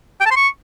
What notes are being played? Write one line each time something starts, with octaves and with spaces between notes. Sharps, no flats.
G5
A5
C6
C#6